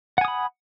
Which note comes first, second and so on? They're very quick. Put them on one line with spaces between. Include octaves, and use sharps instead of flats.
F#5 G#5 D#6 B5